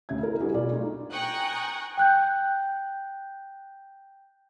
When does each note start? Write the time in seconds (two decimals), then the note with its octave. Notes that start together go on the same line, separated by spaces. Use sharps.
0.09 D2 C#3 E5 G#6
0.22 E4 A4 A#4
0.40 G3 D4 E4 F#4 G#4 A4
0.54 B1 B2 F4 D5
0.71 A3 D4 D#4 F4
1.13 G5 G#5 A#5 C#6 D#6 F#6
1.97 G5 F#6 G6